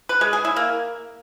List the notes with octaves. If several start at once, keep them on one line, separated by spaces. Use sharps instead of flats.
B4
G#3
G#4
E4
A#3